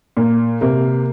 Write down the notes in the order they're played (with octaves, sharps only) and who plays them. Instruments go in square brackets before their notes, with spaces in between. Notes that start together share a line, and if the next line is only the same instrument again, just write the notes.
[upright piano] A#2 [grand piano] A#3
[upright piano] C3 [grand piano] A#3